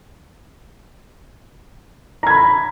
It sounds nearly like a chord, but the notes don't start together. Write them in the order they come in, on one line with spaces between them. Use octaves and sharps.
A#5 G#6 B5